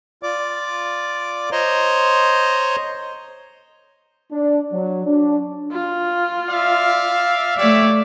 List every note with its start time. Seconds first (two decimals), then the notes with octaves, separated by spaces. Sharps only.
0.23 F4 D5 D6
1.52 C5 C#5 D#5 A#5 C6
4.32 D4
4.73 F#3
5.06 D4
5.71 F4
6.50 D5 E5 F5
7.58 A3 G4 C#5 D5 E5